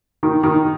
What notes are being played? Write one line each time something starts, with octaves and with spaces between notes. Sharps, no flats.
D#3
D#3